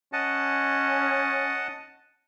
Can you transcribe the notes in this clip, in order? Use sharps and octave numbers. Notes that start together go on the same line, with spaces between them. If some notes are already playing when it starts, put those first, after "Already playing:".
C#4 D#5 F#5 A5